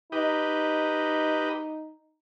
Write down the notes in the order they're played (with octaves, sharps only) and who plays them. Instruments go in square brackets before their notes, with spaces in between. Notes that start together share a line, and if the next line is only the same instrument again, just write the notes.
[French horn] D#4 [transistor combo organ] G4 B4 D#5